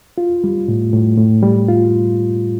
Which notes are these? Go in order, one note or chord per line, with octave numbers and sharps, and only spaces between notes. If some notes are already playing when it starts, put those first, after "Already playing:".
F4
G3
A2
A2
A2
G3
F4